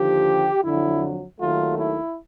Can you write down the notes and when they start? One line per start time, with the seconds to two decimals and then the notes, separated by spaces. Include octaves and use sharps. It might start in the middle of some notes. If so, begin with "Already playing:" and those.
Already playing: D#2 D3 F3 G4
0.64 F2 D3 F#3 E4
1.39 D#2 D#3 F#3 A3 F4
1.77 E4